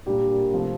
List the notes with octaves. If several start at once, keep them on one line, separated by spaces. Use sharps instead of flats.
A#2 G3 D4 G4 A#4
C3 F3 A3